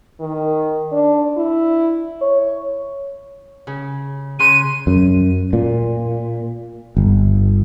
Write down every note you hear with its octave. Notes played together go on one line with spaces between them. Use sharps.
D#3
D4
E4
C#5
C#3
C#3 C6 F#6 D#7
F#2
A#2
G1